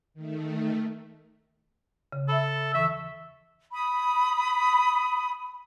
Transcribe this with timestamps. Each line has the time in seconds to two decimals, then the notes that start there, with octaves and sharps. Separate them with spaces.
0.14 D#3 A3
2.12 C#3
2.28 A4 E5 B5
2.74 D#2 E3 E5 C#6
3.73 B5 D#6